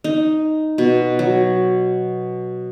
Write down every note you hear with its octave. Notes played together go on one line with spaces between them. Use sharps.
D#4
B2
F#3